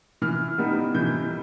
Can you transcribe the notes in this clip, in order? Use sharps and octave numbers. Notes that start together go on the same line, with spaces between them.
E3 F6
G3 B3 D#4
E3 G6